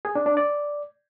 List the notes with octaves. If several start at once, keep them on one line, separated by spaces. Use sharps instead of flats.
G#4
D4
D4
D5